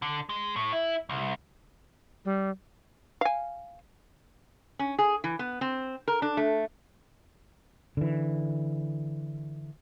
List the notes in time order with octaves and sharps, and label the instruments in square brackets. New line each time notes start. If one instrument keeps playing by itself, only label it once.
[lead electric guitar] D3
G#3
A2
E4
C2
[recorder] G3
[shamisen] F5 G#5
[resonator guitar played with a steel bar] C#4
G#4
E3
B3
C4
A#4
D4
A3
[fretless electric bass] D3 E3